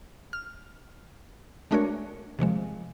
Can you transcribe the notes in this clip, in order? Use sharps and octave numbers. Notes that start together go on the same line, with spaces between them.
F6
G#3 A3 D4 F#4 A#4 C#5
C3 D#3 F3 G#3